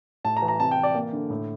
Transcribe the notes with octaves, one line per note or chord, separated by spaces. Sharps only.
A2 A5
A#5
E3
A#5
C3 A5
G5
E3
D5
A#3
D3
A2